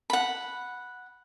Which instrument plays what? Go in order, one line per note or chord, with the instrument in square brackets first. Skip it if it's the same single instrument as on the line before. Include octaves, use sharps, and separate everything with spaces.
[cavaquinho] F#5 B5